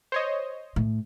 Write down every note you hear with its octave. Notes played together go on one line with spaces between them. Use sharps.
C5 C#5 D#5
A2